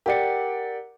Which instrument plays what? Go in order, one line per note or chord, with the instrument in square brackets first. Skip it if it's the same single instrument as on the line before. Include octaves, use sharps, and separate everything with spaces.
[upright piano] G4 D5 [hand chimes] A#4 F#5 C#7